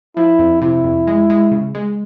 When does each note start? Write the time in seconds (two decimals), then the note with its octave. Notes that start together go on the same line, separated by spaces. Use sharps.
0.16 F3 E4
0.39 F2
0.61 C3 E4
0.84 F2
1.07 G#3
1.30 G#3
1.52 C#3
1.75 G#3